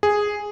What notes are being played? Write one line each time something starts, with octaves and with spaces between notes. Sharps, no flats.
G#4